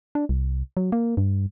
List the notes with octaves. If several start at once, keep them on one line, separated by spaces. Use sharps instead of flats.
D4
C2
F#3
A#3
G2